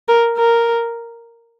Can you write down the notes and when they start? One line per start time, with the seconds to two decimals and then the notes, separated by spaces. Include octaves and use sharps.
0.08 A#4
0.37 A#4